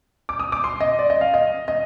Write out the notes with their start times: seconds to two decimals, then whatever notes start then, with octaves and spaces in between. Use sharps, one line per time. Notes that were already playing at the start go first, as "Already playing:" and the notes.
0.29 D6
0.40 D#6
0.52 D6
0.64 C6
0.80 D#5
0.99 D5
1.10 D#5
1.21 F5
1.34 D#5
1.68 D#5